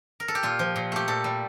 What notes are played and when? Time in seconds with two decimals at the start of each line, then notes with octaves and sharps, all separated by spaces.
0.20 A#4
0.28 A4
0.35 G4
0.43 A#2 F4
0.59 F3
0.76 A#2
0.92 A3 G4
1.08 A#2 A4
1.24 G3